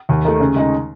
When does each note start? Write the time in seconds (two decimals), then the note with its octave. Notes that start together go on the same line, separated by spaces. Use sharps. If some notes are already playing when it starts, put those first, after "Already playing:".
0.09 D#2
0.25 D#3 A3
0.40 C#3
0.56 G#3 D#4